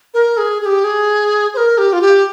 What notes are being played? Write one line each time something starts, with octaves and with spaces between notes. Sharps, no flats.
A#4
G#4
G#4
G4
G#4
C5
A#4
G4
F4
G4